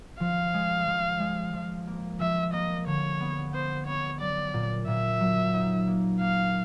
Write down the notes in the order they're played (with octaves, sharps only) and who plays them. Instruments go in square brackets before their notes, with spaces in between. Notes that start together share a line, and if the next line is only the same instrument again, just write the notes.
[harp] F3 [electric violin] F5
[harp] G#3
F3
G#3
F3
A#3
[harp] F3 [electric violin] E5
[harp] A#3 [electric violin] D#5
[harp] D3 [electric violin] C#5
[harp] B3
[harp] B3 [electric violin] C5
[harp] B3 [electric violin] C#5
[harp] F#3 [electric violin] D5
[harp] A#2
[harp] A#2 [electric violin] E5
[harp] F#3
D#4
A#3
[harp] A#3 [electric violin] F5